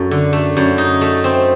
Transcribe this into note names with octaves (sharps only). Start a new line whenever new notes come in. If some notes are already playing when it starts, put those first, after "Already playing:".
Already playing: F#2 A3
D3
A3
F#2
D#4
A3
C4